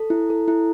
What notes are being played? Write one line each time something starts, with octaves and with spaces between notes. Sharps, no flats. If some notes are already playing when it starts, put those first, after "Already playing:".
Already playing: A4
E4
A4
E4